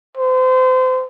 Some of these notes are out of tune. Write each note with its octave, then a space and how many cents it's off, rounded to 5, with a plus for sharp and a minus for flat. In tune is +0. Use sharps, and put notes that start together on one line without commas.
C5 -30